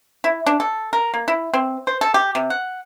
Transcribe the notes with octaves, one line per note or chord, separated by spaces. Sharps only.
E4
D4
A4
A#4
A#3
E4
C4
C5
A4
G4
C3
F#5